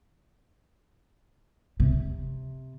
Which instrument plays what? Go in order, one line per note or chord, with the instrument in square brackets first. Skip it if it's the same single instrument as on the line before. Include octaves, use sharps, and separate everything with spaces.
[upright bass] C3